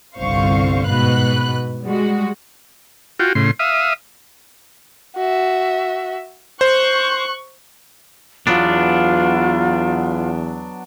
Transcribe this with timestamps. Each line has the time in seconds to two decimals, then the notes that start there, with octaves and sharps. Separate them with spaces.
0.17 G1 C2 D3 C5 F5 C#6
0.87 G#2 B2 B4 F#6
1.85 G3 G#3 F#4
3.20 F4 F#4 G5
3.35 A2 C#3 C6
3.59 E5 F5 D#6
5.16 F#4 E5
6.61 C5 C#6 F#6
8.47 E2 F#3 B3 D4 F4